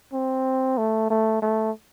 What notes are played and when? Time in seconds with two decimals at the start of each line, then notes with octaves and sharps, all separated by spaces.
0.13 C4
0.78 A3
1.10 A3
1.42 A3